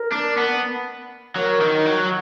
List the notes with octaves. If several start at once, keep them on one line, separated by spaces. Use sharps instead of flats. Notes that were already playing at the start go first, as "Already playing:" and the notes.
Already playing: A#4
D4
B3
F#3 A#4
D#3
F#3